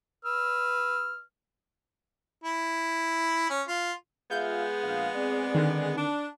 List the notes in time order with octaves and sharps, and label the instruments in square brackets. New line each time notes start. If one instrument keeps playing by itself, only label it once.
[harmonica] B4 E6 F6
E4
C#4
F4
[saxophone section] G#3 B3 G#4 [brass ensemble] F4 E5 F5 [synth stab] G6
[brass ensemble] A#1 F5
C4 D5
[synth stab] D3 D#3
[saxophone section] D4